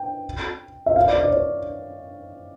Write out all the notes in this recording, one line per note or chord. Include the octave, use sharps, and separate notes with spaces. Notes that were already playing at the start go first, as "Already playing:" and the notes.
Already playing: G5
E5
F5
D5
D5
C#5